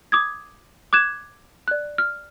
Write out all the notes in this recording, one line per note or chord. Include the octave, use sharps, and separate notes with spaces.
D6 D#6 G#6
D6 F#6 G#6 E7
D5 F#6
F6